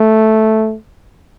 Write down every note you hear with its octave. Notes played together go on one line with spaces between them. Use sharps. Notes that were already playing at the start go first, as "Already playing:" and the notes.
Already playing: A3